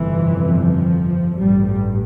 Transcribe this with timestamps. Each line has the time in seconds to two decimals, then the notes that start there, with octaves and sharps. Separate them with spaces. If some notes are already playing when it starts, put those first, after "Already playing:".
Already playing: G1 F2 C3 E3
0.57 F3
1.37 A1 G2 G3